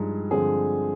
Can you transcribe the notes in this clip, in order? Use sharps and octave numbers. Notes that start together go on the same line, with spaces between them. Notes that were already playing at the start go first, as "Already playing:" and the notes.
Already playing: G2 F3 G#3 D#4
G2 D3 F3 G#3 C4 G#4